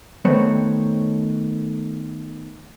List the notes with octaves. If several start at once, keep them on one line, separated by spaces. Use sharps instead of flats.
D#3 A3 B3 C4 C5 C#5